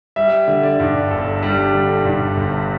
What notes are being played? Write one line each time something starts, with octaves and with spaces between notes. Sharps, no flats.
G3 E5
D3
D5
G2
G1 A4
G3
D3
G2
G1